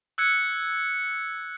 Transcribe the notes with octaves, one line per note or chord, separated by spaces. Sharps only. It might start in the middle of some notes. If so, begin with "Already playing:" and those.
E6 F#6 G#6 C#7